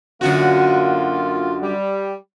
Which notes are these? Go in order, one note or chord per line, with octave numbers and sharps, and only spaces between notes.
F#2 D3 A#3 F4 F#4
G3